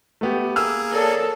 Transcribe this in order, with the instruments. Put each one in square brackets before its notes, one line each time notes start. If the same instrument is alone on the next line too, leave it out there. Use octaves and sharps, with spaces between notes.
[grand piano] A3 B3 G4
[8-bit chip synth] A#3 G#4 [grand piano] E6 F6
[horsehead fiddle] A4 [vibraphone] A#4 C#5 D5